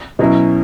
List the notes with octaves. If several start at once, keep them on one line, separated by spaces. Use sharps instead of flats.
B2 F#3 C#4 E4